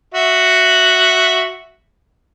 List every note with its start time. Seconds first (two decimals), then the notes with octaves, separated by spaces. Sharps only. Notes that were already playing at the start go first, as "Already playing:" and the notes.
0.14 F#4 E5 F#5